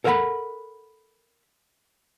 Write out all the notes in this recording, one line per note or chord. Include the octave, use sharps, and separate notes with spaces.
A4 A#4 C5 F5 F#5 B5